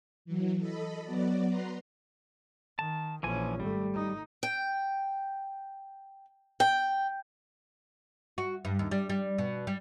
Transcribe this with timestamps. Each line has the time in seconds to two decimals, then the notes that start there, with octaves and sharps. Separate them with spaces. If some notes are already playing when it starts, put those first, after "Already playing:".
0.25 E3 F#3
0.58 A4 D#5 B5
1.04 F#3 B3 F#4 D5
1.45 B4 A#5 C6
2.79 D#3 A5
3.23 A#1 E3 F3 C#4 G#5
3.60 G#1 G3 A3
3.94 D#4
4.43 G5
6.60 G5
8.38 F#4
8.65 G2
8.79 D#2
8.91 G3
9.09 G3
9.38 B2
9.67 G3